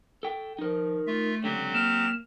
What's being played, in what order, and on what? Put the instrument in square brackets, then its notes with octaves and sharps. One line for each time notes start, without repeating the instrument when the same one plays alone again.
[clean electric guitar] A4 G5
[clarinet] F3 [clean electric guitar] D#4 A#4
[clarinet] A3 [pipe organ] F4 E5
[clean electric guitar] C#2 D3 [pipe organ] F#3 C4 G4
[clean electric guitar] A#3 [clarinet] F6 [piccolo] E7